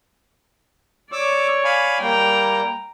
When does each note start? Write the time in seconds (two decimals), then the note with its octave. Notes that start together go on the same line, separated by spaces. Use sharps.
1.12 C#5 D5 D6 E6
1.65 F5 G#5 B5
2.01 G3 A#3 G5 A#5